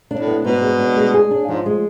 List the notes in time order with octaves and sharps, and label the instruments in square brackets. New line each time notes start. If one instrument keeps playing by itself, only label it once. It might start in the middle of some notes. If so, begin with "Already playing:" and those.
[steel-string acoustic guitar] D4
[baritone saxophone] A2
[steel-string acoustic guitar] B3
[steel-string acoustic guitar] G#2 [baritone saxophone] B2
[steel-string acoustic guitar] G#3
D4
G#3
G#4
D4
[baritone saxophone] G#2 [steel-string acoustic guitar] F3
[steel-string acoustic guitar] G#3